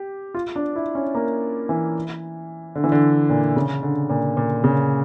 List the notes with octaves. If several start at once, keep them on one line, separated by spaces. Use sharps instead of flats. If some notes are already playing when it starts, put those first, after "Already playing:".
Already playing: G4
F4
D4
E4
C#4
A#3
E3
D3
E3
D3
A#2
C#3
D3
A#2
A#2
C#3